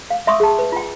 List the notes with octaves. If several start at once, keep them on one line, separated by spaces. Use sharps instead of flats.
F5
E5 C6 C#6 D#6 E6
G#4 A5
B4
F4 G5